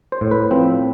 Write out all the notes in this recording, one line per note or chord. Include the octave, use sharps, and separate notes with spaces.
C5
A2
B4
F3 C4